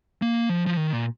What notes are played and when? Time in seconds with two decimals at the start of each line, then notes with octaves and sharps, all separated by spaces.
0.22 A#3
0.49 F3
0.66 F3
0.77 D#3
0.93 A#2